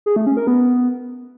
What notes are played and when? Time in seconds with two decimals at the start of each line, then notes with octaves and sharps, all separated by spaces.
0.06 G#4
0.16 A3
0.27 C#4
0.37 A#4
0.47 B3